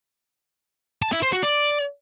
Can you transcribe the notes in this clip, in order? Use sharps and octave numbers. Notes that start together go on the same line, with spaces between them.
A5
E4
C5
F#4
D5